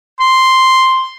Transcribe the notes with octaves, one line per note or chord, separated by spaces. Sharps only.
C6